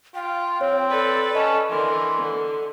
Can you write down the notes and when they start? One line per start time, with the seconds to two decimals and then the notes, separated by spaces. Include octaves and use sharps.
0.15 F4 G5
0.61 C4 C#5
0.90 A4 B4 D5
1.35 C#4 D#5 A5
1.71 D3 E3 A#4 C6
2.18 D3